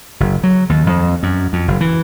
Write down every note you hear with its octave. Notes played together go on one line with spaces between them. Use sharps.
F#1
F#3
D#2
F2
F#2
F2
F#1
E3